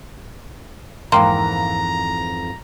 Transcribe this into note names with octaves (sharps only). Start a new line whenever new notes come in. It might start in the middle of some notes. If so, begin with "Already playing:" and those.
F2 G#2 E3 A#3 F5 G5 A#5 C6